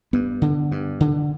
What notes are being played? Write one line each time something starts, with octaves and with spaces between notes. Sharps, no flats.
G2 B3
D3
G2
D3